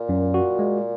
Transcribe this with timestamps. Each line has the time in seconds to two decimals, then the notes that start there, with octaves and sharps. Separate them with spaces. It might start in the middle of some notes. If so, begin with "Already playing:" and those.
Already playing: A#2
0.09 F#2
0.34 F#4
0.59 G#3